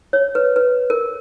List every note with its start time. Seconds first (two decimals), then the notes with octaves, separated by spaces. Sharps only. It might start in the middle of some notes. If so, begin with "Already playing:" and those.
0.13 C#5
0.35 B4
0.56 B4
0.90 A#4